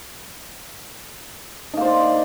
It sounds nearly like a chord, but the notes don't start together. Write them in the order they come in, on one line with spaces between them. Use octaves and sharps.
D#4 A#3 C5 D5